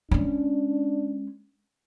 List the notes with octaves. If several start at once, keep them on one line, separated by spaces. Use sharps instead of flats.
G#3 C#4 D4